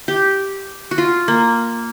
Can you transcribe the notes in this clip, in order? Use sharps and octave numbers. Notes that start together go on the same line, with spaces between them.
G4
F#4
F4
A#3